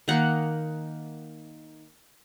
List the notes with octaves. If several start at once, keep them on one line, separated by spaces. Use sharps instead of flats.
D#3 A#3 F#5